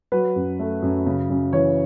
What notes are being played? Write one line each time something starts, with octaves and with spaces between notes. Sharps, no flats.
F#3 B4
F#2
A3
F#2
C#3
F#2
E3 C#5